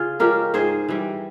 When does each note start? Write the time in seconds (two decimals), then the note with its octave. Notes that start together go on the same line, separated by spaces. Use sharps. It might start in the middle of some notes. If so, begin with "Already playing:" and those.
Already playing: C#3 F4 G#4
0.19 F3 G#3 C#4 G4 A#4
0.54 G#2 G#4 C5
0.89 E3 G3